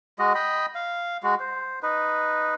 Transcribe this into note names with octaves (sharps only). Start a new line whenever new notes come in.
G#3 F#4 D#5
D#5 G5 B5
F5
G#3 F#4
C5
D#4 B4